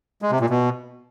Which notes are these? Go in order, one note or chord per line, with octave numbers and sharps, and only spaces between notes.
G#3
C3
A#2
B2